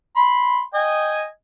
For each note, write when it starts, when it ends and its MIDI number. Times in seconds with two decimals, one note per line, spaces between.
0.16 0.61 83
0.16 0.61 84
0.74 1.26 75
0.74 1.26 79
0.74 1.26 80